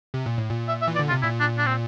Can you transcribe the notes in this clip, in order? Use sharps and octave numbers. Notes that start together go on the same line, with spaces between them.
C3
A#2
A2
A#2
E5
E5
E3
D5
D3
C3 F4
A#2 E4
D4
D4
C4